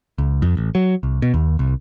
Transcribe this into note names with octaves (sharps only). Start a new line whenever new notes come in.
C#2
F2
A1
F#3
C2
B2
D#2
C2